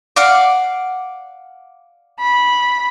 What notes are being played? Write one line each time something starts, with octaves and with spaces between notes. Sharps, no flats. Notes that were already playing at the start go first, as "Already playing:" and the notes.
D5 F5 F#5
B5